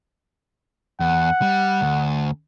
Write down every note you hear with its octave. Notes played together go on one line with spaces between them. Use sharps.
E2 F#5
G3
D2